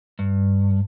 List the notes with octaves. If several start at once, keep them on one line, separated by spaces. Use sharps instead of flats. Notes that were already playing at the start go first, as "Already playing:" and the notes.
G2